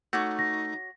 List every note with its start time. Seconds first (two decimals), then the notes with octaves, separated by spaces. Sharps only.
0.13 A3 D#4 F#4 C#5 D6
0.39 A#6